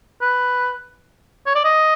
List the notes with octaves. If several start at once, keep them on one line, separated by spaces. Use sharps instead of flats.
B4
C#5
D5
D#5